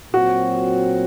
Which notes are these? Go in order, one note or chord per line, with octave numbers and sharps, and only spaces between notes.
A#2 F#3 C4 F#4